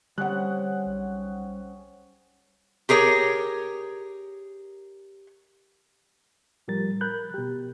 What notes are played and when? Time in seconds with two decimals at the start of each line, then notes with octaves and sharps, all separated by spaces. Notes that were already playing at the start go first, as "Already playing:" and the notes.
0.18 D3 G3 C4 C#4 G#4 F#5 F#6
0.86 B1
2.89 G4 G#4 A#4 C#5
6.68 A2 F3 G3 A#4 A6
7.01 A#4 B5 F#6 G6
7.34 B2 G4